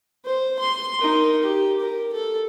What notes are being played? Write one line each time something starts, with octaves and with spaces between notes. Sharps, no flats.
C5
C6
D#4 A#4
G4
A#4
A4